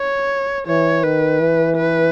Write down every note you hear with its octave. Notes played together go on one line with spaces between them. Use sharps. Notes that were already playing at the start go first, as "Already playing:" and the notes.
Already playing: C#5
E3 C#5
D#3 B4
E3
B4